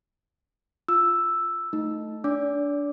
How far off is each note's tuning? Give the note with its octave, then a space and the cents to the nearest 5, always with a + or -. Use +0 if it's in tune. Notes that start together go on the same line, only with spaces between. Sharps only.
F4 +0 E6 +0
A3 +0 D#4 +0
D4 -20 D5 -40 D6 +0